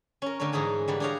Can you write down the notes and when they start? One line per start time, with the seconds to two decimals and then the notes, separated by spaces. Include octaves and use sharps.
0.22 C#4 A#4
0.40 D3 A3 C#4 A#4
0.53 G#2 E3 D#4 G#4 A#5
0.88 D3 E3 G3
1.00 D4 G4 G#4 C#5 F5 A#5